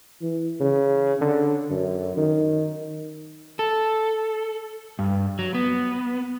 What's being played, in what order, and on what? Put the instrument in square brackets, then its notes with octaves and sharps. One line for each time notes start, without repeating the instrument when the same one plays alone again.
[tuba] E3
C#3
D3
F#2
D#3
[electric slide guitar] A4
G2
F#3
B3